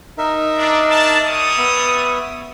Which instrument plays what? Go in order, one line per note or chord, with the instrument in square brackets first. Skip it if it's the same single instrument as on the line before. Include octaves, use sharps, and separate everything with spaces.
[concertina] D#4 A#4 E5
[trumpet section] D4
D4 A5
G3 C#5 D#6
[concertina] B3 E5